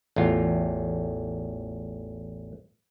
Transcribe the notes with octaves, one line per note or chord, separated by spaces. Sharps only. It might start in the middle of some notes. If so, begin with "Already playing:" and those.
A1 E2 F4